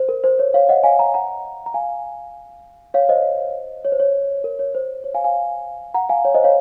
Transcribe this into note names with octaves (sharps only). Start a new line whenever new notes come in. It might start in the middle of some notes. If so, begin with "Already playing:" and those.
Already playing: C5
A#4
C5
C#5
C#5 F5
D#5 F#5
F5 G#5
F#5 A#5
F#5 A#5
A#5
F5 G#5
C#5 F5
C5 D#5
C#5
C5
C#5
A#4
C#5
C5
C#5
F5 G#5
F5 G#5
F#5 A#5
F5 G#5
C#5
C5 D#5
C#5 F5